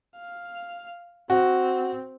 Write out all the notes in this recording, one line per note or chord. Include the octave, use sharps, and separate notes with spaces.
F5
C4 F#4